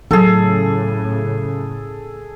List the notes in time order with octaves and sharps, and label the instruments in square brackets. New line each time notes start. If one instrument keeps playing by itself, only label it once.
[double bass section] A2 C#3 [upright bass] F#3 E4 [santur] G#4 A4